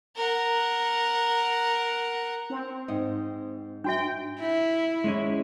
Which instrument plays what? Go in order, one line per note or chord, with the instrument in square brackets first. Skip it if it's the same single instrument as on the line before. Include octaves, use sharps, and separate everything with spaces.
[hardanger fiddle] A#4 F#5
[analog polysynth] C4
[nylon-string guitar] G#2 D#5
[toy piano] D4 F#4 E5 [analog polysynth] G5
[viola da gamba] E4
[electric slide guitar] G#3 C#4 E4